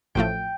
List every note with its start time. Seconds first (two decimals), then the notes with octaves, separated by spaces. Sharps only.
0.15 A1 A2 F3 A3 G5